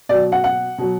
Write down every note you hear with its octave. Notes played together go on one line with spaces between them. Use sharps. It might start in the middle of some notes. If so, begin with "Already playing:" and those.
B2 F#3 D5
F#5
F#5
B2 F#3